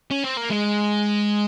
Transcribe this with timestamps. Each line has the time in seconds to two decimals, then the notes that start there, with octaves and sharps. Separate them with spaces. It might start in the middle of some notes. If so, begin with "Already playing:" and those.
0.11 C#4
0.24 C4
0.37 A#3
0.50 G#3